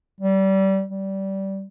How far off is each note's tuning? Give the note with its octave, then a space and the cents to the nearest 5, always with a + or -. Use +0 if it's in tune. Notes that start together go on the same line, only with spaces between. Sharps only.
G3 -25
G3 -20